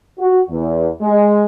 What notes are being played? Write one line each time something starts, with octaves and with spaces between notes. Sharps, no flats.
F#4
E2
G#3